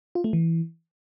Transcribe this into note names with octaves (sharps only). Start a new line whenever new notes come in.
F4
A3
E3